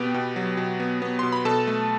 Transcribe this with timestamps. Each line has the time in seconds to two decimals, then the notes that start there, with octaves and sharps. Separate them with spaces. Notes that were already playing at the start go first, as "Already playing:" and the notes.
Already playing: B2 B3 G4 G5
0.14 B2
0.36 F#3
0.57 B2
0.80 B3
1.02 B3
1.19 B2 C6
1.32 B5
1.45 B2 A4 A5
1.67 A3